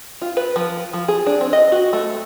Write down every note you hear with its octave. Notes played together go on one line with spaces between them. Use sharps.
F4
B4
F3
F3
G#4
D4
C4
D#5
F#4
A3